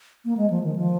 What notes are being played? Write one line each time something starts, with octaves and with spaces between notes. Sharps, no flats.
A#3
G#3
F3
D#3
F3